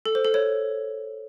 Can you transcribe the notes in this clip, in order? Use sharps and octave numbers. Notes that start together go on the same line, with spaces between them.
A4
C5
A4
C#5